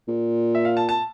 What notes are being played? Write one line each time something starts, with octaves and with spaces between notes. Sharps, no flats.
A#2
E5
F5
A5
A5